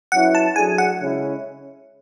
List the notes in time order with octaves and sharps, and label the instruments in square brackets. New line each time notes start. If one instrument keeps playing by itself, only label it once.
[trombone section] F#3 C#4 E4 B4 [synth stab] F#5
[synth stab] A5
[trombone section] F#3 A3 D4 G#4 [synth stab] G#5
[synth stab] F#5
[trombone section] C#3 G#3 C#4 E4